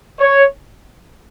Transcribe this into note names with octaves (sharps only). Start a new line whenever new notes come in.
C#5